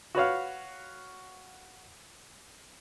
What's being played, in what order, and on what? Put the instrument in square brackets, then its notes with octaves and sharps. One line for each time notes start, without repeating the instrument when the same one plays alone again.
[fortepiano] F#4 B4 C#5 F5